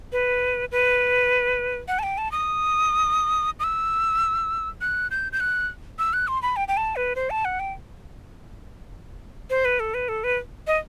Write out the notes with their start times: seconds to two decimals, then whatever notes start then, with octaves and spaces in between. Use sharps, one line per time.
0.12 B4
0.72 B4
1.88 F#5
1.99 A5
2.03 G5
2.18 A5
2.32 D#6
3.60 D#6
3.64 E6
4.81 F#6
5.11 G6
5.32 G6
5.40 F#6
5.99 E6
6.13 F#6
6.28 C6
6.42 B5
6.56 G5
6.68 G5
6.77 A5
6.96 B4
7.16 C5
7.30 A5
7.45 F#5
7.60 G5
9.50 C5
9.65 B4
9.80 A4
9.94 B4
10.09 A4
10.24 B4
10.67 D#5